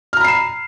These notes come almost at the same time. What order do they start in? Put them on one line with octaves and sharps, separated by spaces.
F6 A#5 B5 C7 E7